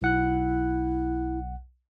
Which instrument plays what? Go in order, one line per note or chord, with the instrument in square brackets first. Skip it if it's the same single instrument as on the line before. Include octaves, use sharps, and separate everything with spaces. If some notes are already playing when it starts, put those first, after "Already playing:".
[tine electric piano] B1 F#5 F#6 [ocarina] E4